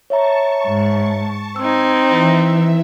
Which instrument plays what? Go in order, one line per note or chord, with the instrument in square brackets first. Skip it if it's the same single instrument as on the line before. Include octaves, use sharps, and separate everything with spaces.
[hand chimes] C#5 E5 A#5 [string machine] A5 C#6
[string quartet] G#2
[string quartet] C4 D#4 [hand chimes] E6 [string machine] G#6
[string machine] E3 E5